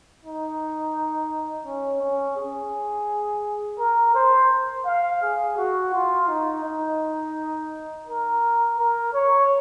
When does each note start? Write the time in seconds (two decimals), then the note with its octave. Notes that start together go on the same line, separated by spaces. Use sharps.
0.24 D#4
1.66 C#4
2.02 C#4
2.37 G#4
3.79 A#4
4.15 C5
4.86 F5
5.22 G#4
5.57 F#4
5.94 F4
6.28 D#4
6.65 D#4
8.07 A#4
8.78 A#4
9.14 C#5